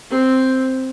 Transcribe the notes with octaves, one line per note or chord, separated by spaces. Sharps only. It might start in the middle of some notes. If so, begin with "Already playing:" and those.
C4